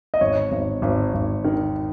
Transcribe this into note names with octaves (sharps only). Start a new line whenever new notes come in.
D#5
G#1 C#5
G#1
G#1
G#1
D#3